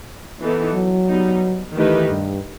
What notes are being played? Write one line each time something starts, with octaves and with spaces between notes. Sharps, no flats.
E3 B3 D#4 A4
F#3
G3 B3 D#4
D#3 E3 A3 D#4 G4 B4
G2